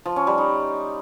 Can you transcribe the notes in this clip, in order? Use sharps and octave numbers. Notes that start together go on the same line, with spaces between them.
F3
C#4
G3
D#4